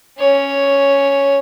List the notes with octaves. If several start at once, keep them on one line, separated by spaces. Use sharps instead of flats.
C#4 C#5